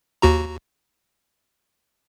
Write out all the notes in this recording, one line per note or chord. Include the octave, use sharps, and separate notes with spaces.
D#2 F#4 A#5